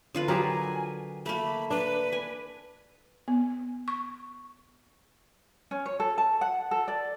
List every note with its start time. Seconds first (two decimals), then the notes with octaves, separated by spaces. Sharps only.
0.15 D3 F4 B4
0.28 F#3 G4 G#4 A#4 G#5
1.26 A3 A#3 B5
1.70 D4 B4
2.12 G#5
3.28 B3
3.88 C#6
5.71 C#4
5.86 C#5
6.00 A4
6.18 A5
6.41 F#5
6.71 A4
6.88 D5